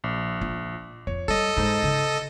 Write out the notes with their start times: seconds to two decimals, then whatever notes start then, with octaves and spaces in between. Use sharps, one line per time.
0.04 A#1
0.41 F4
1.07 F2 C#5
1.28 G3 A4 D#5
1.57 G#2 D#4 C5
1.83 C#3